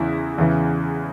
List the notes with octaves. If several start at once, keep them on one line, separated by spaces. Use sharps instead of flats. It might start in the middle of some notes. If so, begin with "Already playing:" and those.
Already playing: E2 C#3 E3 E4
E2 C#3 E3